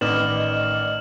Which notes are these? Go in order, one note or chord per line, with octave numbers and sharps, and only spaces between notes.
A1 D#3 B4 D5 D#5 F6 E7 F#7